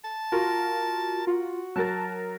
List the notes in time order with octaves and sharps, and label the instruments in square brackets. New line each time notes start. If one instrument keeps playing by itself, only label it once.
[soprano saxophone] A5
[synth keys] F4 F#4 [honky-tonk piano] A#4
[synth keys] F4 [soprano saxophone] F#4
[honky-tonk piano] F#3 A#4 A6 [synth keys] A5